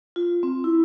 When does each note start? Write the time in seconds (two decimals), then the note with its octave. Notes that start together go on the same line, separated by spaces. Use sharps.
0.16 F4
0.43 C4
0.64 E4